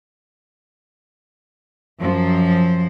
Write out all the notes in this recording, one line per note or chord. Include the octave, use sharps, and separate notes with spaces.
F#2 F3 C5